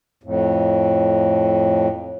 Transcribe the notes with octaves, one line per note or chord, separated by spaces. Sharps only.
F2 A2